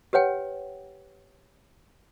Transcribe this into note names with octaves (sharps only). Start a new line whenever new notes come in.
G4 B4 C#5 F#5 G5